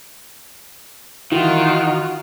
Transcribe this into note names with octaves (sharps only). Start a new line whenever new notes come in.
D#3 E3 F4 F#4